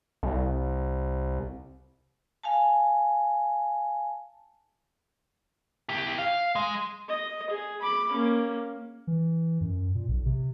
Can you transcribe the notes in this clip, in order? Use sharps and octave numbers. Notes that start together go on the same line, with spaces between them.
C2
F5 G#5 A5
E4 G4
F5
G#3
D#5
G#4
B5 D6
A#3 C#4
E3
F#2
A#2
B1
C3